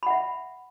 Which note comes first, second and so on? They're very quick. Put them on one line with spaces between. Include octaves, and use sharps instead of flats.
B5 F#5 E5